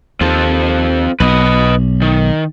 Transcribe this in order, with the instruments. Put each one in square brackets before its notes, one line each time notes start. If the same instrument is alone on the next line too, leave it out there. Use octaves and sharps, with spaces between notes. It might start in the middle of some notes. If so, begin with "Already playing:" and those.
[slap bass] D#2 [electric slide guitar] C4 F4 A4
[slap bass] B1 [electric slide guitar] B4 D#5
[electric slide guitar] D#3